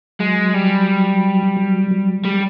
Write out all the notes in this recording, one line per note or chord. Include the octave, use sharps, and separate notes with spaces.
F#3 G#3
G3
F#3
F#3
G3 G#3